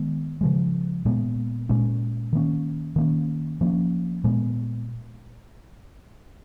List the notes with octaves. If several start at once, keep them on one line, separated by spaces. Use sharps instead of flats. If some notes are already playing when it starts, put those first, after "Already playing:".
Already playing: D#3 G#3 B3
C#3 F3 G#3
A#2 G#3 B3
A#2 G#3 C#4
D#3 A#3 C#4
D#3 A#3 C#4
F3 A#3 C#4
A#2 G#3 B3